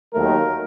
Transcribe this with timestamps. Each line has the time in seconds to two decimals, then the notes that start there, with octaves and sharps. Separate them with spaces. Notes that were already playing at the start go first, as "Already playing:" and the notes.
0.13 D#2 D#3 F#3 A3 A#4